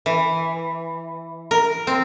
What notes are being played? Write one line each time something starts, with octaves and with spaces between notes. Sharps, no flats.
E3
A#4
C4